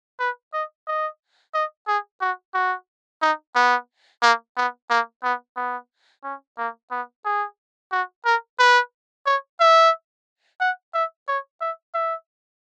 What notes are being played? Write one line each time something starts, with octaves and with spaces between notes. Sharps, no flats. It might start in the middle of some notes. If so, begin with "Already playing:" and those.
B4
D#5
D#5
D#5
G#4
F#4
F#4
D#4
B3
A#3
B3
A#3
B3
B3
C#4
A#3
B3
G#4
F#4
A#4
B4
C#5
E5
F#5
E5
C#5
E5
E5